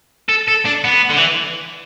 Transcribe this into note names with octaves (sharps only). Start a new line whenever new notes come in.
A4
A4
D4
B3
D3
E3